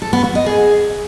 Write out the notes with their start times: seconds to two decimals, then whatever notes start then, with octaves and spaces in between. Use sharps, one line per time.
0.02 A4
0.13 B3
0.24 F#4
0.35 D#5
0.46 G#4